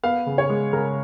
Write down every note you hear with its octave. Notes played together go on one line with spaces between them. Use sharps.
B3 F5
C#3
C#5
G#3
C#3 A#4